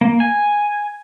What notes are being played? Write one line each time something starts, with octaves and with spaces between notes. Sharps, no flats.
A#3
G#5